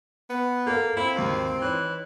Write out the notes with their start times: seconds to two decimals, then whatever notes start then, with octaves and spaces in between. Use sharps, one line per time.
0.30 B3
0.66 A#3 A4 A#4 F5
0.97 C4 E4 F5
1.16 G#1 D#2 C7
1.61 E3 D#4 C#5